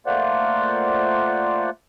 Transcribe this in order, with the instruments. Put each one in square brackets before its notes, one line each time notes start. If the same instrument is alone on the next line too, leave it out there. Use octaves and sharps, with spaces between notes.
[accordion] A3 A#3 F4 C5 D5 F#5